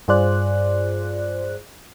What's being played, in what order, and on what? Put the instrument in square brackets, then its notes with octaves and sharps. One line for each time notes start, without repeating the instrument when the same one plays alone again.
[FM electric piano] G2 F4 G#4 C5 D5 F#6